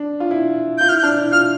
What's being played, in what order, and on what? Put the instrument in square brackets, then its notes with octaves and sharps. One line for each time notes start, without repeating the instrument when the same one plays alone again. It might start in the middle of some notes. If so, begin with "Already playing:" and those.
Already playing: [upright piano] D4
F4
E4
[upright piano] F4 [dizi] G6
[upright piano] E4 [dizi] F6
[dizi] G6
[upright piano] D4 [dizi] F6
[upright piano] E4
[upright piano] F4 [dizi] F6